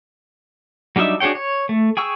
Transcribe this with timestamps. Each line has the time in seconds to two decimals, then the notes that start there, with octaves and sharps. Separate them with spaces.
0.96 F#3 G3 D4 D#4 E5
1.20 D4 F#4 G#4 C#5 G5
1.35 C#5
1.69 A3
1.97 G#4 G5 C#6 E6